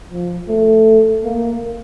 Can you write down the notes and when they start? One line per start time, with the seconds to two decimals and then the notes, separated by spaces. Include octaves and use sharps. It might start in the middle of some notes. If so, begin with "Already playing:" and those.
0.12 F3
0.48 A3
1.24 A#3